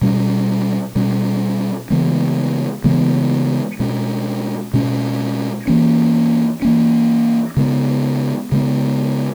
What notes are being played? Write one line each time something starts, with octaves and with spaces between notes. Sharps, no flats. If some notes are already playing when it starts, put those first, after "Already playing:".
B2 G3 C#4
B2 G3 C#4
C#3 E3 G#3 B3
C#3 E3 G#3 B3
B2 G#3 C#4
B2 G#3 C#4
E3 A#3 C#4
E3 A#3 C#4
C#3 G#3 B3
C#3 G#3 B3